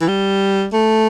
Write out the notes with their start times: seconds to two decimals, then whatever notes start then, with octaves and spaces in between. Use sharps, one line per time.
0.01 E3
0.08 G3
0.73 A3